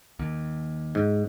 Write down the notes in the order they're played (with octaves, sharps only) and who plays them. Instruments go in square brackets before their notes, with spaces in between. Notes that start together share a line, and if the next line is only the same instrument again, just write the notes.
[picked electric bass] D#2
[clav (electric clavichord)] G#2